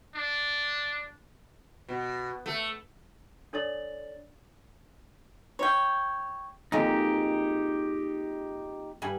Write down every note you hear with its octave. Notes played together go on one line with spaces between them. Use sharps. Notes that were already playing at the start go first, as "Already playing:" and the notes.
D4
B2
A3
D4 A4 C#5 D5 A6 F#7
C#5 G5
F2 G#3 A#3 D#4 G4
G2 G#5 B5